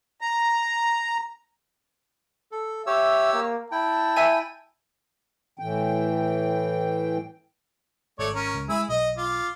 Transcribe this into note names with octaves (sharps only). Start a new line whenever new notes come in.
A#5
A4
G4 C#5 E5 E6
A#3
E4 G5 A5
E5 G#5 D#7
A2 E3 G5
G#1 A3 C#5 D5
C#4 A#4
C#2
G#3 E4 G#4 E6
B1 D#5
F4 D6